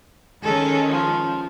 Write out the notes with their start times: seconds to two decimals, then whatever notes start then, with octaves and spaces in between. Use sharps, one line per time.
0.43 D#3 G#3 C#4 A4
0.91 F3